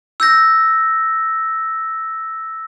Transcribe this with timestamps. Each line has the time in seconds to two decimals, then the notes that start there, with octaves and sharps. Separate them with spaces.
0.20 E6 G6 A#6